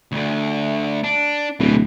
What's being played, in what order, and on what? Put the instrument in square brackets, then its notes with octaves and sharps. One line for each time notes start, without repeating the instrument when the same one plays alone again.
[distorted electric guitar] D2 D3
D4
[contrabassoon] D1 [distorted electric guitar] B2 E3